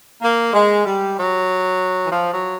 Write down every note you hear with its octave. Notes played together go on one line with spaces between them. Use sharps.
A#3
G#3
G3
F#3
E3
F3
F#3